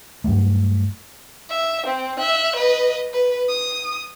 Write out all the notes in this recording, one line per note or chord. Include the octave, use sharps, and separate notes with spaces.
G2 F#3 G3 A3
E5
C4
E5 F#6
B4 D#5
B4
D#6